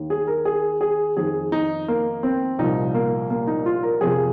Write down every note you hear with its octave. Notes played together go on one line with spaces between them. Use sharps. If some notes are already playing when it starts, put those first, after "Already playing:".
Already playing: D#2 D#3
G#4
A#4
G#4
G#4
F2 D#3 G#4
D#4
A#3
C4
C2 A#2 F3 D#4
A#3
A#3
D#4
F4
A#4
F2 C3 F3 G#4